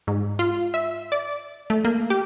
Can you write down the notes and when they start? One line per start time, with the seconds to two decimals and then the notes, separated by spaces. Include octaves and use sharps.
0.07 G#2
0.39 F4
0.74 E5
1.12 D5
1.70 A3
1.85 A#3
2.10 G4